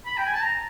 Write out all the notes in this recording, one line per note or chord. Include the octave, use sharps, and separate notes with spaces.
B5
G5
G#5
A5
A#5